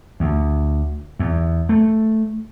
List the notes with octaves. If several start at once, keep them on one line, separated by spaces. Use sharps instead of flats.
D2
E2
A3